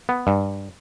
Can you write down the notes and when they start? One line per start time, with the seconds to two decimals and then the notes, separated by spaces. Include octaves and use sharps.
0.09 B3
0.27 G2